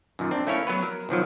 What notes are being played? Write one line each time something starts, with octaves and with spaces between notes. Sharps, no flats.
F#2 A#2 D#3
C4 D4
A3 A#3 C#4 E4 C#5
F#3 B3 B4
A#4
B1 D#3 F3 F#3